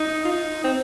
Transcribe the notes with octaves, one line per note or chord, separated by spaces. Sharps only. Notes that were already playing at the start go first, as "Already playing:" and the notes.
Already playing: D#4
F4
D#4
C4